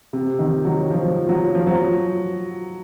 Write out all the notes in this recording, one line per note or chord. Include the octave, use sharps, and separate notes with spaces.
C3
D#3
F#3
F3
F#3
F3
F#3